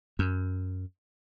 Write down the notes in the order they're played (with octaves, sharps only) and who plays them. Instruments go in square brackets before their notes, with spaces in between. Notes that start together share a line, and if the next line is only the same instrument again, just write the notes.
[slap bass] F#2